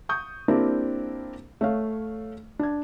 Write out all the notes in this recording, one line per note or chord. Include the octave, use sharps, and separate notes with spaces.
C#6 D#6 G6
A#3 C4 D4 E4 G4 A#4
A3 C#5 F5
D4 G#6